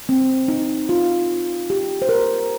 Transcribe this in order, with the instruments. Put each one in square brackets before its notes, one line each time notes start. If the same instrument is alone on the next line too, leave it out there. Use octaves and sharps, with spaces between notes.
[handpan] C4
D#4
F4
G4
C5
A#4